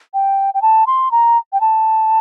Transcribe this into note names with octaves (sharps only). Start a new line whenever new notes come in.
G5
G5
A5
C6
A#5
G5
A5